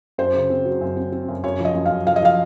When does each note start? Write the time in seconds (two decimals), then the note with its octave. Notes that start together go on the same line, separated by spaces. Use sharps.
0.18 F#2 C5
0.34 C#3
0.50 C4
0.65 F#3
0.81 F#2
0.97 C4
1.12 C4
1.28 F#2
1.44 F#2 C#5
1.59 F3
1.65 D#5
1.75 F#2
1.86 F5
1.91 F#2
2.07 F3 F5
2.16 D#5
2.22 F3 F5